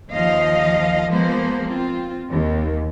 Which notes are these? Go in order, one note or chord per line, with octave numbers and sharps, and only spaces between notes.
D#2 F3 D#5 F5
F3 G#3 A#3 B3 C5
C4 F4
D#2